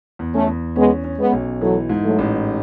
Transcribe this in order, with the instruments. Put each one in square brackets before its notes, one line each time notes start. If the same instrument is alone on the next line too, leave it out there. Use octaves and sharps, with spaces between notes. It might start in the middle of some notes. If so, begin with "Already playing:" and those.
[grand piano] E2
[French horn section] A3 C#4
[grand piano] E2
[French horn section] G#3 B3 [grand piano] C#4
[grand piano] C#4
[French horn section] G#3 B3
[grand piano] B1
[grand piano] E3 [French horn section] F#3 A3
[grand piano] G#2
[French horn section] F#3 A3
[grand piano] A1